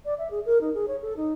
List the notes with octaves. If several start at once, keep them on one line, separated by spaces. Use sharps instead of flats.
D5
E5
G#4
A#4
D#4
G#4
C#5
A4
D#4